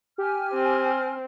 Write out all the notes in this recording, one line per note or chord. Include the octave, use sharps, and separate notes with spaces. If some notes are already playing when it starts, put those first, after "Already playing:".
G4 G#5 F6
C4